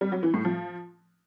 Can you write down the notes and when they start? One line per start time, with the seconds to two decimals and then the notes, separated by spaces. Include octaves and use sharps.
0.01 G3
0.12 F#3
0.23 E3
0.34 A2
0.45 F3